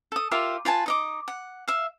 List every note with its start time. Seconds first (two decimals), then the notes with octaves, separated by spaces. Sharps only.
0.12 A4 D#6
0.31 F4 G4 A#4 E5
0.65 F4 B4 G#5 A5
0.86 D#4 D#5 D6
1.28 F#5
1.68 E5 F5